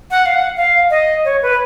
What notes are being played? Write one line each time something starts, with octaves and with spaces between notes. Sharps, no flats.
F#5
F5
F#5
F5
D#5
C#5
B4